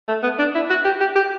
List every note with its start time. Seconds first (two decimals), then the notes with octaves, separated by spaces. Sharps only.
0.09 A3
0.23 B3
0.39 D4
0.55 E4
0.70 F#4
0.85 G4
1.00 G4
1.16 G4